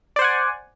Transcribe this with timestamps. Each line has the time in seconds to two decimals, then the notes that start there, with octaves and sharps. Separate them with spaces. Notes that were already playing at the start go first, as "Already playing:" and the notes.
0.16 D5
0.19 C5
0.22 F#5
0.24 G#5